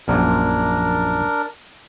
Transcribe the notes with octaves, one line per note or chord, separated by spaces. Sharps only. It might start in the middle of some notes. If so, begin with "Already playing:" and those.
A#1 F#2 A#2 D4 A#4